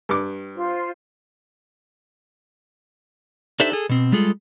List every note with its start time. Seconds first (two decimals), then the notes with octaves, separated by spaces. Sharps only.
0.09 G2 D6
0.56 F4 C5
3.60 D4 D#4 G4 A4 C5 E5
3.72 G#4 A4
3.89 B2 C4
4.12 G3 G#3 F4 G#4 A4